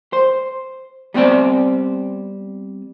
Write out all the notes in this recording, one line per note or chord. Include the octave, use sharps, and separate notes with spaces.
C5
G3 B3 C4 C5 D5